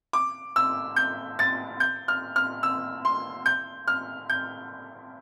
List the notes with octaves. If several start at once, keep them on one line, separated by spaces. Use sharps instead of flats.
D6
E6
G6
A6
G6
F6
F6
E6
C6
G6
F6
G6